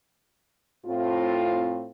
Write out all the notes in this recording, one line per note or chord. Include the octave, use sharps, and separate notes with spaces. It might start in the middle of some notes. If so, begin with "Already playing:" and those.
A2 C4 F4